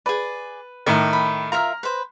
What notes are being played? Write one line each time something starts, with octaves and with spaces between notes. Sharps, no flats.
G#4 B4 D5
A2 D#3 D6
B5
F4 A#4 E5 A#5 F6
B4 C5